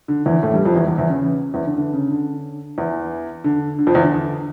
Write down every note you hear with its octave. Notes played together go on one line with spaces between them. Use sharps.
D3
E2 E3
A2 A3
G2 G3
F2 F3
E2 E3
E2 E3
E2 E3
C#3
E2 E3
D3
D3
C#3
D3
E2 E3
D3
D3
F2 F3
E2 E3
D3